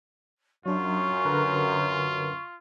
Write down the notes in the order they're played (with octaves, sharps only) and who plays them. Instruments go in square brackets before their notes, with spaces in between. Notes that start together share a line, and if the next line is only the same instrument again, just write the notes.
[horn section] F#2 [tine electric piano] F#3 D4 [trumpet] F4 [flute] C#6
[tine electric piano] D3 A#4 B4